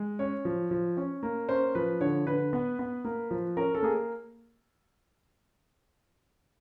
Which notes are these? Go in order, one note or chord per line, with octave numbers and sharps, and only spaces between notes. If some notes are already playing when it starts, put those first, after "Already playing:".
Already playing: G#3
C#4 C#5
F3
F3
C#4
A#3
C#4 C5
F3 B4
D3 C#5
D3 B4
B3
B3
A#3
F3
C#4 A#4
A4
A#3 G#4